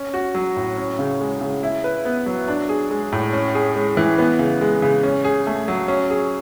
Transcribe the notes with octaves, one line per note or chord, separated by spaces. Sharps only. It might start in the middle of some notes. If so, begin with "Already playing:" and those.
Already playing: C#4
F#4
F#3
A2
C#4
C#3
G#3
C#3
E4
B4
B3
F#3
D4
G#4
G#3
A2
C#4
G#4
G#3
E3
B3
C#3
G#3
C#3
C#4
G#4
A3
F#3
C#4
G#4